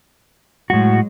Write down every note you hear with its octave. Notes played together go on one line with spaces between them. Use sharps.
A2 F#3 G#3 F#4